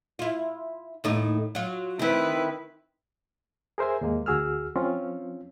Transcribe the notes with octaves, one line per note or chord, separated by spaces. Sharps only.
E4 F4
D#2 A2 D#4
F#3 F4
D#3 C4 E4 B4
G#4 A#4 C5 E5 G#5
D#2 G#2 G#3 A#3
D2 F#4 G#4 E6 F6
F3 C4 C#4 F4